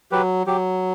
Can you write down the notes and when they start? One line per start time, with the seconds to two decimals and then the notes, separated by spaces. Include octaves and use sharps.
0.11 F#3 G4 B4
0.47 F#3 G4